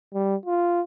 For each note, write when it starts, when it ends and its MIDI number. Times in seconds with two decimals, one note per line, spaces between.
0.14 0.36 55
0.46 0.81 65